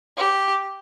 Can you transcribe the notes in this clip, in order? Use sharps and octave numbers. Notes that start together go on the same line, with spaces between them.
G4